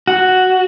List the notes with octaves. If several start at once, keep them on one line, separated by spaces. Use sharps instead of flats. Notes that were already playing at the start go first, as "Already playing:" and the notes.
F#4